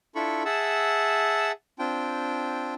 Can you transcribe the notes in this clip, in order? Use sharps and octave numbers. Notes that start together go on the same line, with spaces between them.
D4 E4 F4 A4 B5 C#6
G#4 E5 F#5 A5 E6
C4 D4 F4 G5